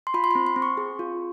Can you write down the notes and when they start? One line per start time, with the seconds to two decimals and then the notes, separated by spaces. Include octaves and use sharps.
0.07 C6
0.14 F4 B5
0.24 C6
0.31 C4 B5
0.46 C6
0.56 C4
0.62 C#6
0.77 G#4
0.99 F4